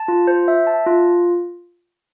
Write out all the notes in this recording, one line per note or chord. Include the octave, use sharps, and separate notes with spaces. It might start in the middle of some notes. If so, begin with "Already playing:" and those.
Already playing: A5
F4
C5
E5
A5
F4